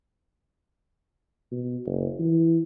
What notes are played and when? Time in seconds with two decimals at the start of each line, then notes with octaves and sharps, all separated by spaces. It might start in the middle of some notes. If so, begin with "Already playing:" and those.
1.52 B2
1.85 F#1
2.19 E3